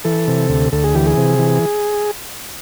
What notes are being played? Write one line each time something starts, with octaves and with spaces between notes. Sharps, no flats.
E3 A4
C3
D2
D2 A4
G#4
E3 G4
G#4
C3
E3